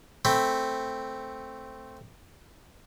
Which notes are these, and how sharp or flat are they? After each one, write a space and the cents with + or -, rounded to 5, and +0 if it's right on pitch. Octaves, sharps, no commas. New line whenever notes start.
A3 +5 C4 +0 B5 +0